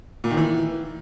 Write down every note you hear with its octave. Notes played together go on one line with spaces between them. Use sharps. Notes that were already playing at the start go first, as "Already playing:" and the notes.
A#2
D#3
E3